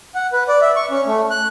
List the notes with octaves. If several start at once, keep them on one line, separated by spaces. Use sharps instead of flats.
F#5
B4
D5
E5
C#6
C#4
A3
F#6